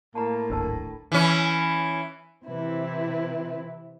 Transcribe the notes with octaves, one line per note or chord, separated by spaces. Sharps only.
A2 A#3 A5 A#5
D1 G#1 D4 A#4 A5
E3 C#4
C3 E3 C4 E4 B4